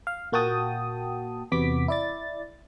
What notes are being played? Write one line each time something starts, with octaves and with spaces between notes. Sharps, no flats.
F5
A#2 A#3 F#4 G5 A5 D#6
E2 C3 B3 F#4 D6 B6
E4 D5 A6